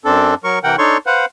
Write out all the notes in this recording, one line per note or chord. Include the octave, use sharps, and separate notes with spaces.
F#2 C4 D4 A4
F#3 A#4 C#6
C3 E3 A#4 F#5 G5
D4 D#4 A4 C#5 C6 C#6
B4 C5 F5 F#5